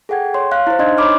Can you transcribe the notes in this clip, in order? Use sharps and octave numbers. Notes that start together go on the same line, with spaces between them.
G#4 A4 F#5 G5 G#6
C#5 C6
F5 F#6
E4 C5
D4 D#4 D#5 C6 G#6
C#5 A#5 B5 D6 F6